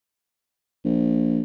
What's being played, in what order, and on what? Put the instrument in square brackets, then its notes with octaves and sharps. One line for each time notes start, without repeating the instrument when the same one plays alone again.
[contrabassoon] A#1